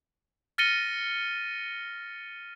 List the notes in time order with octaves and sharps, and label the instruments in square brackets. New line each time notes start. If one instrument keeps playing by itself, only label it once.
[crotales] F6 A6 A#6 C#7 D#7 G7